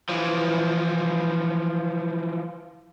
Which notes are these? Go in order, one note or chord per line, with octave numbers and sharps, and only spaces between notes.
E3 F3